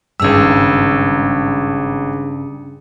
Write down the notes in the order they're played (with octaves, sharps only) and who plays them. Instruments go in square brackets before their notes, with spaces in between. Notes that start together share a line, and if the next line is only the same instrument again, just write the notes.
[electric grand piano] G#1 E6 [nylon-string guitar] G2 C#3 [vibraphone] G3 D4 G#4